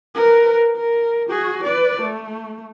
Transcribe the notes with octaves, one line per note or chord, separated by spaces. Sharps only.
A#4 B4
A#4
F#4 G#4
B4 D5
A3